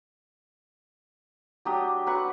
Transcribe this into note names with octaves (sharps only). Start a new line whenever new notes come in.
F#3 D4 G4 D#6
F#3 B4 F#5 C#6